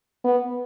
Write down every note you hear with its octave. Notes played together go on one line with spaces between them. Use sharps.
B3